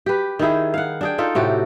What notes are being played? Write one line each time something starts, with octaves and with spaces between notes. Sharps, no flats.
G4 B4
D#3 D#4 E4 G#4
F5 F#5
D4 G#4 G5
D#4 F4 A4
A2 C3 F#4 G4